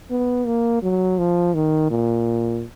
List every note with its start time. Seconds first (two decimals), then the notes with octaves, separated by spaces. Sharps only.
0.11 B3
0.46 A#3
0.83 F#3
1.18 F3
1.55 D#3
1.91 A#2